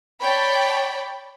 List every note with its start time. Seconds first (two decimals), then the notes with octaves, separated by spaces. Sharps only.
0.20 C#5 D5 G5 A5 B5